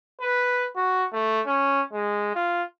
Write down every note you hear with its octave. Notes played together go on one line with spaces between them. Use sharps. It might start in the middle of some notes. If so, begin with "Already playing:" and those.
B4
F#4
A3
C#4
G#3
F4